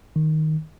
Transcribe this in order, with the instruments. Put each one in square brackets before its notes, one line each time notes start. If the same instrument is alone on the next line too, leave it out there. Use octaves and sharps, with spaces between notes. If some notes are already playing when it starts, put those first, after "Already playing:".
[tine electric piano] D#3